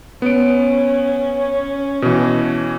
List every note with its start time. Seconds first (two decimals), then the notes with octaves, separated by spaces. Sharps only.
0.22 B3 C#4 D7
2.02 B2 E3